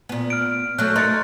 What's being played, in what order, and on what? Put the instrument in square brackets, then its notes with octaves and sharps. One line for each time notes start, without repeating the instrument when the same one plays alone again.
[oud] A#2 B3
[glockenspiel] F6 D7
[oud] F#3 A3 [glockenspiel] F#6 G6
[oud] D#4 A#4 [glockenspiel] C6 A6 C#7